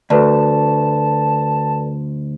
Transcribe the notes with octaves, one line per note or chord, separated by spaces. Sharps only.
D2 A4 B4 D5 A5